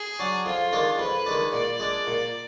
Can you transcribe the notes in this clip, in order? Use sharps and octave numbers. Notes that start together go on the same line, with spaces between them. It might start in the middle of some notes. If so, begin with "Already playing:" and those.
Already playing: G#4
F#3 D4
F2 F4
D#3 G#3 D4
F2 B4
D#3 G#3 D4
A#2 D5
G#3 D4
A#2